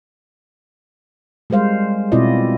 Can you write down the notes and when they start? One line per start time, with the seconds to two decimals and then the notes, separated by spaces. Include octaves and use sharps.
1.50 G3 G#3 A#4 C5 F5
2.12 B2 C4 E4 F4 D5 D#5